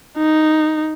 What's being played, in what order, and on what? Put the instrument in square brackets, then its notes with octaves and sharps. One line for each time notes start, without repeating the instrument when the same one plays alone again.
[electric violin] D#4